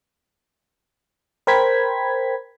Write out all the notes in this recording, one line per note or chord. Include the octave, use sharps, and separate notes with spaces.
A#4 C5 G5 B5 G#6 B6